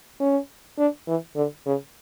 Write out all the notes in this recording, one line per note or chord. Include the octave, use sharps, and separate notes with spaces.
C#4
D4
E3
D3
C#3